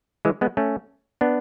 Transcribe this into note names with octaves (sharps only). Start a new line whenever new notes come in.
E3 G#3
G#3 B3
A3 C#4
B3 D4